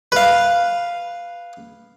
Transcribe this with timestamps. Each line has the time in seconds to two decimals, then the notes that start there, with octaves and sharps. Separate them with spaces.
0.12 B4 F5